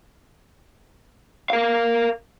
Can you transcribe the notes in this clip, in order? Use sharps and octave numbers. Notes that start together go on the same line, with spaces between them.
A#4 F5